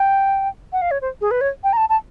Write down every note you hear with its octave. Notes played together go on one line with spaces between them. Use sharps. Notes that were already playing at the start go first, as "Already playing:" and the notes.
Already playing: G5
F#5
F5
C#5
C5
G#4
B4
C#5
G5
A#5
A5
A5